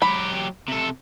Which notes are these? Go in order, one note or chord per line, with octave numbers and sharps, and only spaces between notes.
F#3 G4 B5
C3 A4